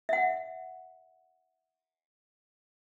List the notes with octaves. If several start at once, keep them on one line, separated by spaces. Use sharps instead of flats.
E5 F#5